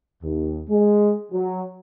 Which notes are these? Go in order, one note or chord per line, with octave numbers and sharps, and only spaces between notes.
D#2
G#3
F#3